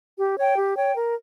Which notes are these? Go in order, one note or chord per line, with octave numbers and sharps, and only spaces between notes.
G4
C#5 G5
G4
C#5 G5
A#4